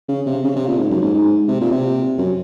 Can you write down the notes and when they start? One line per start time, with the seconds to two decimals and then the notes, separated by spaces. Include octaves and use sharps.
0.09 C#3
0.26 C3
0.44 C#3
0.56 C3
0.67 A#2
0.78 G#2
0.90 F#2
1.02 G#2
1.14 G#2
1.48 C3
1.60 A#2
1.71 C3
2.18 F#2